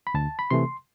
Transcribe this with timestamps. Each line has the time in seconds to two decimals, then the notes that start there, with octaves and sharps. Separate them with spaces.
0.07 B5
0.14 D2 A5
0.39 B5
0.51 C3 E3 A3 C6